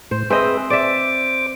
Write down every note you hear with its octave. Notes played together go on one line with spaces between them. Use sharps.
A2 C5
C4 G#4 B4 C5 D#5 E5
C5 D5 E5 D6